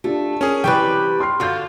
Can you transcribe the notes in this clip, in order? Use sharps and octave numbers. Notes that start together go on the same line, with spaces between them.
A3 D4 F4 G4
C#4 G#4 A#4
C3 E3 G3 B4 G5 C#6
C6 F6 C7
D3 F4 F#4 F6 G6